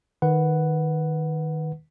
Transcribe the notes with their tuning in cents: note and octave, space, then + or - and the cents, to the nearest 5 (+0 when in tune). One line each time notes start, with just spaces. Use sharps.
D#3 -5 B4 +0 F#5 +0